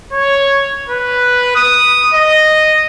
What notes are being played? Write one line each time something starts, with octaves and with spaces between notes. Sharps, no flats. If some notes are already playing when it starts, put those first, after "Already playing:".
C#5
B4
D#6
D#5